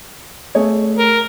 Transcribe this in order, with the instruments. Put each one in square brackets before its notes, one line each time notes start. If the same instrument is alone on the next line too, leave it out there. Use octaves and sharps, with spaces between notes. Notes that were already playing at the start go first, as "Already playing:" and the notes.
[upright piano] A3 G#4 C#5
[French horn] A#4